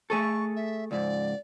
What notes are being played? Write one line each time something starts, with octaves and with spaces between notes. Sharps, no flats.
A3 G#4 A4 C#6
E5
C#2 G#2 D5